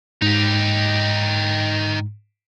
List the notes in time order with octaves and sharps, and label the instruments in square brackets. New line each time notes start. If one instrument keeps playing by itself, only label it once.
[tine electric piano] G#2 [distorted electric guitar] D#4 G4